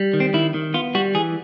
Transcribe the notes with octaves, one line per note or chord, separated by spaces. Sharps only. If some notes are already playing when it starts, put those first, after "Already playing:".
Already playing: G3
D#3
C4
D#3 E4
D#3
B3 F4
G3 F#4
E3 G#4